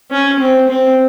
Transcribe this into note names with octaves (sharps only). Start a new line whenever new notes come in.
C#4
C4
C4